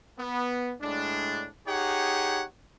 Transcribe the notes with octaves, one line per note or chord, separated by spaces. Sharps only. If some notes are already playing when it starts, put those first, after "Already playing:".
B3
A2 G#3 D4
D#4 G4 G#4 C#5 F#5